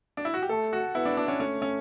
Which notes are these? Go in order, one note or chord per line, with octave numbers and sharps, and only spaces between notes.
D4
E4
F#4
G4
A3 A4
F#4
B3 E4
D4
D4
C#4
A3 C#4
C#4